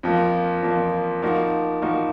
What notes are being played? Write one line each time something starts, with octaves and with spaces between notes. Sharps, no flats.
F2 F3 A#3
F2 F3 A#3
F3 A#3 D#4 F#4
F3 A#3 D#4 F#4